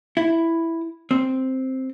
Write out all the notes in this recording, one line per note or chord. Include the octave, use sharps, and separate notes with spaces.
E4
C4